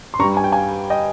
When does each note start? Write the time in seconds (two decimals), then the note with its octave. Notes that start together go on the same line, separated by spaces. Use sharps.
0.14 C6
0.19 G2 G3 A#5 C#6
0.37 G#5
0.44 G5
0.52 F5 G#5
0.90 D#5 G5